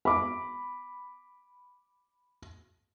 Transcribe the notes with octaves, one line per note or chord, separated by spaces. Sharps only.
B5 D6